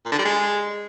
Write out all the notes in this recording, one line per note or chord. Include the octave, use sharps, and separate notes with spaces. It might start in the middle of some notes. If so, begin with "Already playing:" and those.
A#2
D3
G3
G#3